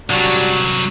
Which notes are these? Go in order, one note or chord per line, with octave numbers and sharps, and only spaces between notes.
C2 F#3 G3 D4 F#4